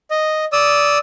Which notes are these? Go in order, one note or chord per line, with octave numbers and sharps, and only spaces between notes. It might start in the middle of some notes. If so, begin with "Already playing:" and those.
D#5
D5 D#6 E6